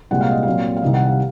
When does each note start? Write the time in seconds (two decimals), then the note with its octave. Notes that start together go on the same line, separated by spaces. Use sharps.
0.11 C2 A#2 G#3 C4 F#5
0.21 F5
0.32 D#5
0.43 A#2 F#3 C4 F5
0.77 F5
0.82 C2 C3 D#3 D#5
0.94 F#5
1.06 F5